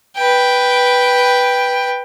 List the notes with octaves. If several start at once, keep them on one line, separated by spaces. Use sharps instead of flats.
B4 G5